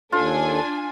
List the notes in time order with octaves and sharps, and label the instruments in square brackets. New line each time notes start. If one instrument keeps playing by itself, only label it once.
[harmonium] D#2 A4 [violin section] D4 G#5 [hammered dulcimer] F4